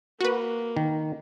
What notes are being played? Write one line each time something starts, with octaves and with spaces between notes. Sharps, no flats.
A#3 F#4 B4
D#3